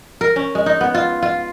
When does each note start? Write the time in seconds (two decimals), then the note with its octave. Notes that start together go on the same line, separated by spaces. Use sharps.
0.21 A#4
0.36 C#4
0.55 G#3
0.66 D#4
0.81 B3
0.95 F4
1.23 F4